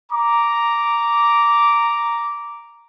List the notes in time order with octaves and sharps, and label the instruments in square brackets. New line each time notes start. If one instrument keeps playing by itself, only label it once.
[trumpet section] A#5 D6